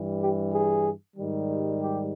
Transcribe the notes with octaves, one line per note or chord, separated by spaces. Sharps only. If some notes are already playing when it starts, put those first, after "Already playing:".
Already playing: G2 E3 G3
G4
G#4
G#2 D#3 G3
G4